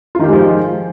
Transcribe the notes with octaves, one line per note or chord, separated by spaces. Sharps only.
D#3 F3 G#3 F4 G4